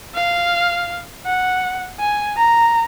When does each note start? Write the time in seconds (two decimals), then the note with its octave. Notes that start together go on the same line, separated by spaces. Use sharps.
0.15 F5
1.26 F#5
1.99 G#5
2.37 A#5